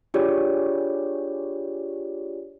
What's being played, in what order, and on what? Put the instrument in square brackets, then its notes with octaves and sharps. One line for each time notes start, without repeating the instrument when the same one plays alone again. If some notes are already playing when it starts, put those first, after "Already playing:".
[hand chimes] D4 F4 G4 G#4 C#5 D5